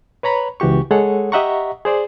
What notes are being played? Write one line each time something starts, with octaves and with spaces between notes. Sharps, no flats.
B4 C#5 A#5 B5
C#2 E3 F#4 G4 C#6
G#3 G#4 A4 C#5 F#5
G4 D#5 E5 F#5 A#5 C#6
G#4 C5 D5